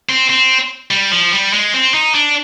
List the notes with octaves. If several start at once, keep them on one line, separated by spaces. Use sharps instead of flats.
C4
C4
G3
F3
G3
G#3
C4
D#4
D4